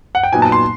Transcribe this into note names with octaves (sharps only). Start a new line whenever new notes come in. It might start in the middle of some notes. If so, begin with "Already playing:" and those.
F#5
G5
A#2 F#3 B3 D#4 G#5
A5
C6